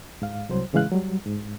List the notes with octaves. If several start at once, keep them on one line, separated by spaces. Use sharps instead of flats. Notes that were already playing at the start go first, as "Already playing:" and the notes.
G#2 F5
C2 F#3 C5
A2 C#3 E3 G#3 F5 F#6
F#3 G3
G#2